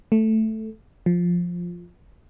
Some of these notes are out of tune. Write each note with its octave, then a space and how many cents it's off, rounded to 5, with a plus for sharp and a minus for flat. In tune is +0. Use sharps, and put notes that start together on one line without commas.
A3 +0
F3 +5